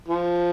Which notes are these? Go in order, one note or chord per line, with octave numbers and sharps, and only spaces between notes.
F3